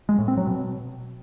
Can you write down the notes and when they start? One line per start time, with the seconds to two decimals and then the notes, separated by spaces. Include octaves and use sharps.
0.09 G#3
0.18 A2
0.28 C4
0.37 F#3
0.47 B2